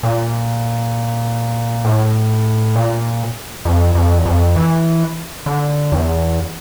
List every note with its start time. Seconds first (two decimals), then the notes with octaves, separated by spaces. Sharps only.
0.03 A#2
1.85 A2
2.76 A#2
3.65 F2
3.95 F2
4.18 E2
4.26 F2
4.56 E3
5.46 D3
5.92 E2